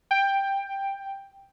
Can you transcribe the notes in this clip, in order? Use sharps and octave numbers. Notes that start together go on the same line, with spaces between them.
G5